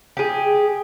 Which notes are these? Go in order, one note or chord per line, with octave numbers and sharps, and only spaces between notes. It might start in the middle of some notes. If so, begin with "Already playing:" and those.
G4 G#4